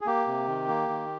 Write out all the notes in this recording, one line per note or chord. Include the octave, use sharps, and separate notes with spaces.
G#4
A#3 G4
C3
D#3
A#3
D#3